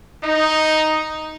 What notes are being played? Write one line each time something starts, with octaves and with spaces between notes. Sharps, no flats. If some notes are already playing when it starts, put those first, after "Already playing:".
D#4